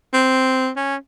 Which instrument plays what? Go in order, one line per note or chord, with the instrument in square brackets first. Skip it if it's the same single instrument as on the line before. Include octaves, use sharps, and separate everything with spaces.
[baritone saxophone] C4
C#4